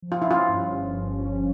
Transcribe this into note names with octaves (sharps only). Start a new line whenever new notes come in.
F3
F4
E4
C#4 F4
G2
G1
F3
C#4